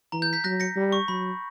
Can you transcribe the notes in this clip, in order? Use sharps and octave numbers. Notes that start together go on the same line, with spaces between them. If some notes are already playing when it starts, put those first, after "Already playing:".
E3 A#5
G6
G6 B6
F#3 F#6 A#6
A#6 C#7
G3
C#6
F#3 B5